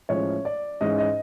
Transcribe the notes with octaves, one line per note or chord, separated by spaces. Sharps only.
A2 F3 G#3 C#4 C#5
D5
G#2 E3 G#3 C#4 D#5
D#5